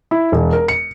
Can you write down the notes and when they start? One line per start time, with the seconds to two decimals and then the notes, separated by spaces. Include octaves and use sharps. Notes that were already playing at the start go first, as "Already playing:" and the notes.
0.11 E4
0.32 E1
0.53 A#4
0.68 C#7